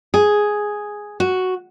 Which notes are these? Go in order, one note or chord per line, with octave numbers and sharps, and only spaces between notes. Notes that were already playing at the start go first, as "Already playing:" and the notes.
G#4
F#4